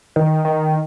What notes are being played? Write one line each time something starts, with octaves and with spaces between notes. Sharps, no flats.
D#3
D#3